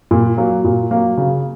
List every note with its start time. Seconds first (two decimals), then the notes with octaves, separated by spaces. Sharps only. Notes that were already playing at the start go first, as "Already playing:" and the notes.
0.11 A#2
0.37 F#3 A#3
0.64 A#2
0.91 F#3 A#3
1.17 C#3